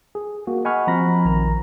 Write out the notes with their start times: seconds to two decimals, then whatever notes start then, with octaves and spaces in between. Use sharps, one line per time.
0.15 G#4
0.47 A#3 F#4
0.65 D#5 F#5 G#5 B5 C#6 F6
0.87 F3 C4 A#5 B5 A#6
1.25 A#1 D#3 A#5